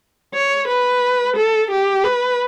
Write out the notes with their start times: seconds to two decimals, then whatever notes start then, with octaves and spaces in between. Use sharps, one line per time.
0.35 C#5
0.68 B4
1.37 A4
1.71 G4
2.04 B4